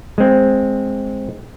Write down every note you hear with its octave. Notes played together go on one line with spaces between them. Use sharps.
G#3 C4